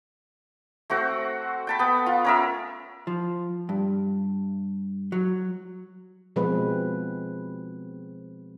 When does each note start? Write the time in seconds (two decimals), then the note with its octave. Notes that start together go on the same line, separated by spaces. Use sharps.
0.90 A3 C4 F#4
1.67 G5 A5 B5
1.79 B3
2.06 F4
2.25 C#4 A#4 E5
3.07 F3
3.69 G2
5.12 F#3
6.36 B2 F3 G#3 C4 B4